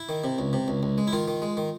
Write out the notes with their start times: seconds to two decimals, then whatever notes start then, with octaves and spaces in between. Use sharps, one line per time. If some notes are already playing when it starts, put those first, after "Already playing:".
Already playing: E4
0.09 D#3
0.24 C3
0.39 C#2
0.53 C3
0.68 C#2
0.83 C#2
0.98 G#3
1.07 E4
1.13 D#3 F4
1.28 D#3
1.42 G#3
1.57 D#3